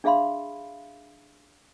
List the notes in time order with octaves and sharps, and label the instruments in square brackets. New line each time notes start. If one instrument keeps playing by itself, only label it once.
[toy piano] D4 G#4 E5 F5 B5 C6